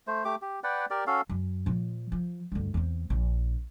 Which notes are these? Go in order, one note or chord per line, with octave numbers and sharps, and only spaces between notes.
A3 C5
A3 G4 D6
G4
B4 D5 F#5 G5
G4 A#4 D5
C#4 F#4 A4 F5
F#2
A#2 F3
F3
D2 G2
E2 C4
A#1